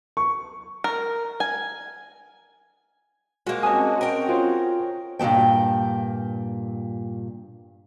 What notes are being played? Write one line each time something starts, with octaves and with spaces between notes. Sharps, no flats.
C#6
A#4
G#5
G#3 A#3 F#4 C5
C4 C#4 F#4 D#5 G#5 A5 D#6
A#4 G5
F4 G#4 C5 C#5
G2 A#2 D#3 A3 G5